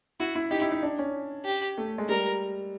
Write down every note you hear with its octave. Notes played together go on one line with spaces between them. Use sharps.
E4 F#4
E4
D#4 G4
E4
D#4
D4
C#4
G4
A3
G#3
G3 A#4